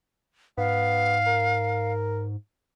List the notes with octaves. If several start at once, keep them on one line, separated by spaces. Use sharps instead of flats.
G#2 B3 F5
A#4